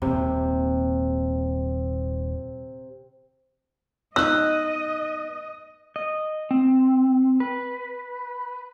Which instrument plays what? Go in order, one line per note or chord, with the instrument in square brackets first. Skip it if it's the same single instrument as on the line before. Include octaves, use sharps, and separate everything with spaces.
[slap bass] D#1 D#2 [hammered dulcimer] C3
[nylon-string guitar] B3 D#4 [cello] D#5 [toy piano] E6 [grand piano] F#6
[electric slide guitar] D#5
C4
B4